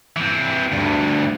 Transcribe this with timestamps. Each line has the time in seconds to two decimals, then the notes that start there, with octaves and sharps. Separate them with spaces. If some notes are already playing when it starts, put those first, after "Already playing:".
0.16 E3 C4
0.72 D2 G2